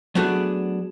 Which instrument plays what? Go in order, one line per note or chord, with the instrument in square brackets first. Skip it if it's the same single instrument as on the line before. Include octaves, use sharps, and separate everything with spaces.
[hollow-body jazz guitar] F#3 A3 B3 D4 F#4 G#4